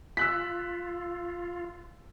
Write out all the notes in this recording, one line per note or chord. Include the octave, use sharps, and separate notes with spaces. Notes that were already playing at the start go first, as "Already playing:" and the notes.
F4 E6 F#6 B6